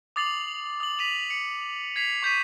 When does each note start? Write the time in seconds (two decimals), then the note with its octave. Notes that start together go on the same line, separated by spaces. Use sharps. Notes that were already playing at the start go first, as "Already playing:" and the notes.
0.16 D6 D#6 A6 C7 F7 F#7
0.80 D#6 F#7
0.99 B6 D#7 F7
1.30 C#7
1.96 G#6 B6 C7 F7
2.23 C#6 G6 B6 D#7